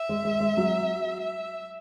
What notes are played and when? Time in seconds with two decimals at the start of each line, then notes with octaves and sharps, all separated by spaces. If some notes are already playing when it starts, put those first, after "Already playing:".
Already playing: E5
0.09 G#3
0.25 G#3
0.40 G#3
0.57 F#3
1.20 E5